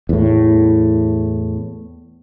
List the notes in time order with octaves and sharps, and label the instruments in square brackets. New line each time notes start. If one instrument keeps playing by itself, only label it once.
[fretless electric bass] E2 A2